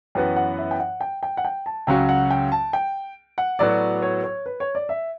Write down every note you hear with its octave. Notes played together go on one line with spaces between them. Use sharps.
F#2 E3 B3 F#4 B4 G5
F#5
E5
G5
F#5
G5
G5
F#5
G5
A5
C#2 C#3 F#3 C#4 F#4 G5
F#5
G5
A5
G5
F#5
A2 F#3 B3 F#4 D5
C#5
C#5
B4
C#5
D5
E5